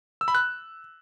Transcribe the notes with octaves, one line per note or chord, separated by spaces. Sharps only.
E6
B5
F#6